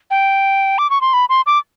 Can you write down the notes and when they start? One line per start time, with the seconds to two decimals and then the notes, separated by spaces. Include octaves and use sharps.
0.11 G5
0.78 D6
0.90 C#6
1.01 C6
1.13 B5
1.29 C6
1.46 D6